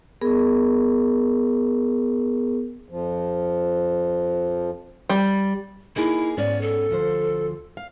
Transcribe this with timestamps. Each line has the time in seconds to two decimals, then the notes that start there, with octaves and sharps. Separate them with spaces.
0.21 B3 G#4 A#4
2.89 F2 F3
5.09 G3
5.96 A#3 D#4 E4 G#4
6.37 G#2 B3 C#4 D5
6.61 A4
6.90 D2 F3 C5
7.77 F5